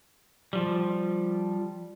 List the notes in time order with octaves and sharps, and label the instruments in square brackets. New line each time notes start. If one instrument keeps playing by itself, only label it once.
[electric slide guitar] F3 G3